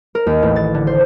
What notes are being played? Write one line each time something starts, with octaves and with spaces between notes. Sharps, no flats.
A#4
D#2
A1
A6
D3
C5